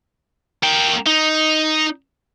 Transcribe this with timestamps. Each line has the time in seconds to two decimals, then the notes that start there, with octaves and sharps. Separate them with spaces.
0.63 A#3 G5
1.06 D#4